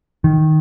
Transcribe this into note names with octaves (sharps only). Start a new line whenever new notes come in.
D#3